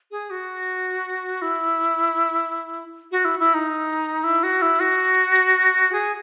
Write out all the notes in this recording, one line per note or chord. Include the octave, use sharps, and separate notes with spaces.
G#4
F#4
E4
F#4
E4
E4
D#4
E4
F#4
E4
F#4
G#4